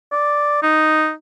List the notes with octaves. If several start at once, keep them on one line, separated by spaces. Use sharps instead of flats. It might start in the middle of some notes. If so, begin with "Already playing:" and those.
D5
D#4